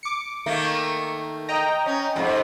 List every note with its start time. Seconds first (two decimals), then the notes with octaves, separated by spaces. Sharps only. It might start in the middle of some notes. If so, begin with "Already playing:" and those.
0.03 D6 C#7
0.46 D#3 A3 A#3
1.49 D#5 G5 A#5
1.86 C#4
2.16 F2 G#2 C3